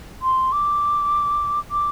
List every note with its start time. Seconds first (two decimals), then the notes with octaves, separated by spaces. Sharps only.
0.22 C6
0.52 D6
1.71 D6